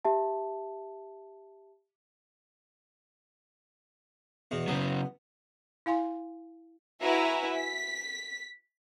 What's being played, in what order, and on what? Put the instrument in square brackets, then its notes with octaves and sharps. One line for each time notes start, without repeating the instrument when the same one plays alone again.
[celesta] G4 E5 A5
[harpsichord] E2 B2
[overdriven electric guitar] C#3 F#3 [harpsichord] B3
[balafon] E4 F5 G#5 C6
[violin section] E4 F#4 B4 E5 G#5 A#5
B6